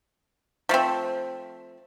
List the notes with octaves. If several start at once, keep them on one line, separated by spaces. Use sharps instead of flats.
F3 A3 C4